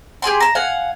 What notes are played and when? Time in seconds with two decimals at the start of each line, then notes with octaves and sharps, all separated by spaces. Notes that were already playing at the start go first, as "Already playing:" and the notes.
0.22 G4 G#4 G#5 C6
0.40 A5 A#5
0.55 F5 F#5 G#5